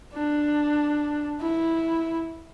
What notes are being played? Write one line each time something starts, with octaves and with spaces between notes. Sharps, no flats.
D4
E4